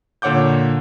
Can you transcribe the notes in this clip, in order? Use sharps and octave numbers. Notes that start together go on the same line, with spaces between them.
A#2 D3 C#5 F#5 D6 G6